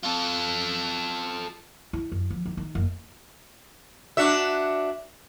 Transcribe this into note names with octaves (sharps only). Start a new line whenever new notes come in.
F4 A4
E4
F#2
F3
D#3
D#3
F#1
D4 F#4 E5